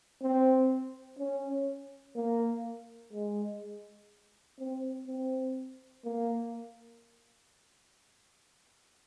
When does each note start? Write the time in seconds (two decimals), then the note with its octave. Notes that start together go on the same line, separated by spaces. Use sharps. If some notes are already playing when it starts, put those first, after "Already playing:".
0.22 C4
1.19 C#4
2.16 A#3
3.13 G#3
4.59 C4
5.07 C4
6.04 A#3